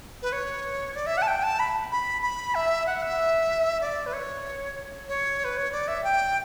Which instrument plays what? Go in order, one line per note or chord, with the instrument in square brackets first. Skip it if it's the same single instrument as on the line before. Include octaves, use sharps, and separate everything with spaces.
[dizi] B4
C#5
D5
E5
F#5
A5
G5
A5
B5
B5
B5
E5
F#5
E5
D5
B4
C#5
C#5
B4
C#5
D5
E5
G5